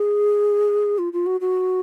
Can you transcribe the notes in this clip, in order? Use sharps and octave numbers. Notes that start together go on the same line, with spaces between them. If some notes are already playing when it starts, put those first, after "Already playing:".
Already playing: G#4
F4
F4
F#4
F#4